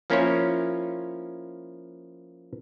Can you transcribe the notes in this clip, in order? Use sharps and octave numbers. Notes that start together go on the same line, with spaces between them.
F3 A#3 C#4 E4 F4 C#5